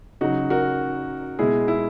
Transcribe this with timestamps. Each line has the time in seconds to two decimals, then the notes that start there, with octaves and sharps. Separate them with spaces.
0.21 C#3 F#3 D#4 F#4
0.50 F#4 A#4
1.39 B2 G#3 E4 G#4
1.68 E4